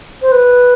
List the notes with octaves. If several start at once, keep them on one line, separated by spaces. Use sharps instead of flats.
C5
B4